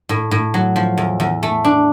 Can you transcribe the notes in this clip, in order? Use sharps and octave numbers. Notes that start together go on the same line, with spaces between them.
A2
A2
F#3
F3
E2
E2
A3
D4